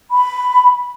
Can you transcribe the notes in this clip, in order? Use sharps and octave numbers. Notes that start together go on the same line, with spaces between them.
B5